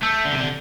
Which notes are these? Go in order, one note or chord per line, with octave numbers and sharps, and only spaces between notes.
A3 E6 G6
D3
C3
D3